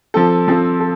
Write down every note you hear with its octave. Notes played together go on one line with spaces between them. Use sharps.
F3 C4 A4
F3 C4 A4
A4